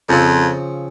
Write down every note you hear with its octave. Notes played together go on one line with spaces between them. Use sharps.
F2 C#3 F3 C4